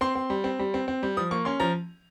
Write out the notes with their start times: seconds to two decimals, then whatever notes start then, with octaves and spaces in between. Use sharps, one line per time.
0.01 C4 C6
0.15 C4
0.30 G3
0.44 C4
0.59 G3
0.74 C4
0.88 C4
1.03 G3
1.17 F3 D#6
1.31 A#3 C#6
1.45 C#4 C6
1.60 F3 A#5